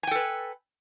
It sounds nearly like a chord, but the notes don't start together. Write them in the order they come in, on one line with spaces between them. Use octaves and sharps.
G#5 G5 A4 B4